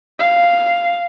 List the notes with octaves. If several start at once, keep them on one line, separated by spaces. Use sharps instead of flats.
F5